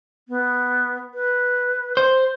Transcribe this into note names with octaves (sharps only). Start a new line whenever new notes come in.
B3
B4
C5